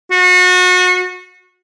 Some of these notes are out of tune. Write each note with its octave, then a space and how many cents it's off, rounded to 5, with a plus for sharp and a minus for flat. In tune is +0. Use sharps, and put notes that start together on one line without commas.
F#4 -30